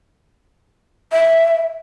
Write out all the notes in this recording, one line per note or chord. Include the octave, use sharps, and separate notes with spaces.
E5